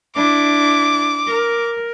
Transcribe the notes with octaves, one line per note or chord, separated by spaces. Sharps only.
D4 E4 D6
A#4